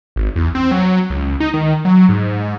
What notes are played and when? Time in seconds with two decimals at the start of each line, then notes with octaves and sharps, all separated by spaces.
0.16 G#1
0.36 E2
0.55 C4
0.71 F#3
1.10 C#2
1.40 D#4
1.54 D#3
1.85 F#3
2.09 G#2